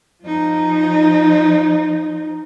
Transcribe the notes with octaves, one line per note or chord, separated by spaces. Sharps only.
F3 D#4